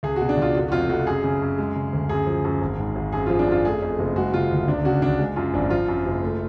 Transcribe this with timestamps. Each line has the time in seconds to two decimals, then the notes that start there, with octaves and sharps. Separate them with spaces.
0.03 C#2 G#4
0.16 F#4
0.21 B2
0.29 D4
0.37 C#2 F4
0.55 F1 F#4
0.68 F#4
0.72 F2 F4
0.89 F1 F#4
1.07 F#2 G#4
1.24 C#3
1.42 F#2
1.58 G#3
1.76 C#3
1.93 D2
2.09 F#2 G#4
2.27 F3
2.45 F#2
2.62 G#1
2.78 G#2
2.96 G#1
3.12 F#2 G#4
3.26 F3 F4
3.39 D4
3.47 F#2 F4
3.65 A3 G#4
3.82 F2
3.99 F#1
4.16 G#3 F#4
4.34 C#3 F4
4.51 D2
4.68 C#2 D4
4.85 C#3 F#4
5.02 C#2 D4
5.19 G#3
5.36 F#2 F4
5.54 G#1 D4
5.70 F3 F4
5.88 F#2
6.05 F#1
6.23 A3